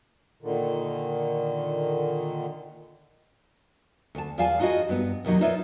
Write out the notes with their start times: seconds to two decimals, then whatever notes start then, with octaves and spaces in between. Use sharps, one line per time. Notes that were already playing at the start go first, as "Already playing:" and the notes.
0.42 A#2 D3 D#3
4.15 D2 A5
4.38 E2 F4 D5 F5 G#5 A5
4.60 D#4 F4 F#4 G#4 D#5
4.89 G2 B3
5.25 D#2 B2 F#3 D#4
5.41 D#4 F4 B4 C#5 D5 E5